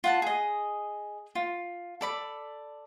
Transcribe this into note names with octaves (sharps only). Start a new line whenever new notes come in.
F4 F#5 A5
G#4 D#5
F4
A4 D5 B5